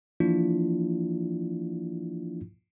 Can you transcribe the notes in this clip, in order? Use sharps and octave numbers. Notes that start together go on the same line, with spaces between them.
E3 F3 A#3 D4 E4 F4